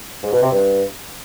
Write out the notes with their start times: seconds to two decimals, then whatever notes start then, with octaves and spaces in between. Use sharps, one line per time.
0.23 G#2
0.32 B2
0.42 C3
0.51 G2